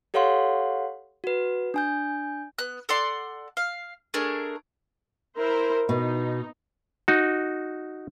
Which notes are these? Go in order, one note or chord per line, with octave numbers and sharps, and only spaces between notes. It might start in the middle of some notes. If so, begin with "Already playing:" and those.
G4 A4 C#5 F5 F#5 C6
F#4 B4
D4 G#5 G6
B3 F#6
A4 D5 F#5 C6
F5
A3 D4 G#4 A#4
E4 A#4 C5
B2 D#4
D#4 F#4